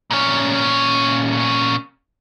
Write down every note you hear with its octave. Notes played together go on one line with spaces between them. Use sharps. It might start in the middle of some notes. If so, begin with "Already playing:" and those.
A#2 C#4